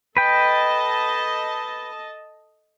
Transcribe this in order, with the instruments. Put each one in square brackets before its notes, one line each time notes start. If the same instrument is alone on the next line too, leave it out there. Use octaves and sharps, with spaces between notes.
[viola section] A4 D#5 A5 [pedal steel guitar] B4 G5